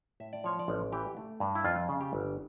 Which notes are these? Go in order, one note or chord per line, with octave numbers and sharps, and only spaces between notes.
A2 E5
D5
F3 C#5
D5
A1
E3 G4
A3
G2
E4
F2 F4
C#3
G4
G1